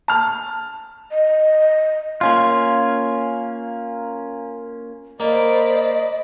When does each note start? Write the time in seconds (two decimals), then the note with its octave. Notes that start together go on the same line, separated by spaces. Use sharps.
0.08 A5 F6
1.11 D#5
2.21 A#3 C#4 F4
5.20 A#3 C5 D5 D#5 B5